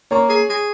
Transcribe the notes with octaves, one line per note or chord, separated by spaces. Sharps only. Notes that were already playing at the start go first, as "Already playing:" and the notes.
A#3 C#5
G#4
G#4